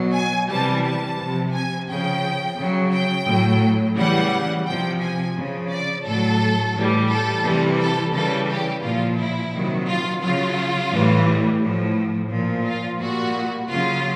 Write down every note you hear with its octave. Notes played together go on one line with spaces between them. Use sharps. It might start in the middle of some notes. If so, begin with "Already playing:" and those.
Already playing: B2 F#3
G#5
C3 E3 G3 A5
A5
C3 F3
G#5
C#3 F3 G5
C#3 F#3
G5
A2 F#3
C#3 E3 G3 F#5
C3 F3 G5
G#5
C#3 F3
D5
A2 F#3 A4
A2 E3 G3
A4
C3 E3 G3
A4
C#3 E3 G3 A4
G4
A#2 F3 F4
E4
C3 D#3 F#3
F4
C#3 F#3 F4
A2 E3 G3
A2 F3
A#2 F3
F4
A#2 G3 F#4
C#3 F#3 F4